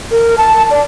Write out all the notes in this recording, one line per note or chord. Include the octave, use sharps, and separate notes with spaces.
A#4
A5
D5